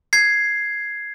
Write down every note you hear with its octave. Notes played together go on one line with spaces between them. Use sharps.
G#6 C7